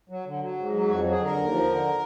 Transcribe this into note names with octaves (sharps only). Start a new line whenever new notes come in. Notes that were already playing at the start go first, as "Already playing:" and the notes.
F#3
D3
F#3
G#2
F#3
F2 F#4
F#3
G#4
D3 A#4
D#2
F3
D3